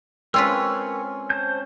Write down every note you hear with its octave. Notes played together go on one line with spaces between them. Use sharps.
G#3 C4 C#4 F4 A#4 B4 C#5 E6
C5 A5 G6